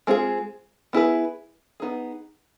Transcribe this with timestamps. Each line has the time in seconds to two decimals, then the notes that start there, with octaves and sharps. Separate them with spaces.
0.07 G#3 C4 F4 G#4
0.93 B3 E4 G#4 B4
1.80 B3 D#4 G#4